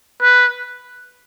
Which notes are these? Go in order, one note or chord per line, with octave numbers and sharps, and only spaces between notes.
B4